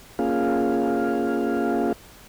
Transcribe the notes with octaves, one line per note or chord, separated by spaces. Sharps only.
A#3 C#4 F4 G#4 F5